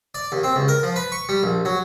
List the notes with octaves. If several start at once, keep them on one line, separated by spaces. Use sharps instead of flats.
D5
D#2
C4
C#2
A#4
F3
B4
C#6
G3
A#1
F#3